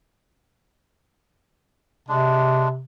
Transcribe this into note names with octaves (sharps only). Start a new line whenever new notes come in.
C3 G#3 D4